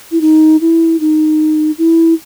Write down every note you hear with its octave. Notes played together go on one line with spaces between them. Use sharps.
E4
D#4
E4
D#4
E4